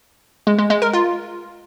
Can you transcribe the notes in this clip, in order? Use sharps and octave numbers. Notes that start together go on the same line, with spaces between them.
G#3
G#3
G#3
A#4
F4